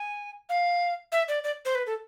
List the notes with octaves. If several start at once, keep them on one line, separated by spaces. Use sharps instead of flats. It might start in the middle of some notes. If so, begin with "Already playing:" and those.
Already playing: G#5
F5
E5
D5
D5
C5
B4
A4